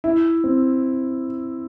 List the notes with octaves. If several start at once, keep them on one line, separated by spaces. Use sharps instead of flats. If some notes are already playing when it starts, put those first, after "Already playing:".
E4
C4